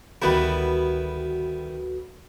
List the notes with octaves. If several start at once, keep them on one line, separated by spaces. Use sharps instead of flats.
D2 D#3 G3 B3 E4 F#4 A4 B4